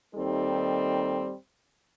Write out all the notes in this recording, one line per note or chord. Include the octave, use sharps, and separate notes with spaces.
D#2 G3 C4 D#4 A4